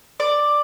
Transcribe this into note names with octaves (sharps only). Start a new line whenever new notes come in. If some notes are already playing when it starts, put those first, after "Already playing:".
D5